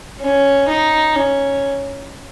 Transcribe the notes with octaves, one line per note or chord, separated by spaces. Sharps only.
C#4
D#4
C#4